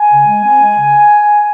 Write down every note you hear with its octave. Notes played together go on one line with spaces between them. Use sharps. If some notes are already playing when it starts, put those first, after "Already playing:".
Already playing: G#5
C#3
G#3
C4
G#3
C#3